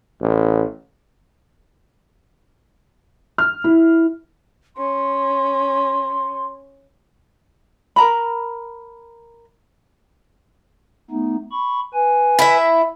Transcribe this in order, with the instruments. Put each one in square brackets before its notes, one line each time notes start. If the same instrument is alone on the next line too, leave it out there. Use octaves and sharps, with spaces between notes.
[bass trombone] A1
[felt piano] F6
E4
[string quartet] C#4 [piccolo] C6
[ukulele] A#4 A#5 B5
[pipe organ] A3 B3 D#4
B5 C#6
B4 G#5
[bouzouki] E4 E5